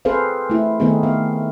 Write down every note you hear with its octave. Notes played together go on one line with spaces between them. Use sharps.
C4 G#4 A4 B4 C5 F5
A3 E4
D#3 A3 B3 C4 D#4 G#4
B3 F5